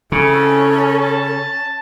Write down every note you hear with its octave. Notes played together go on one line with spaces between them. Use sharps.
C#3 C4 C#4 E4 A4
A5